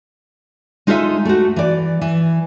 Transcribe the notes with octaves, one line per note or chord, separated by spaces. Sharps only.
G#3 D#4 F4 A4 C#5 E5
A3 F#4
E3 D5
E3